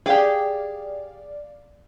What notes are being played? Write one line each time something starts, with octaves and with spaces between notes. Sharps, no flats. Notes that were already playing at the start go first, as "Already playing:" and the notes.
G4 G#4 D5 F5 G5 D6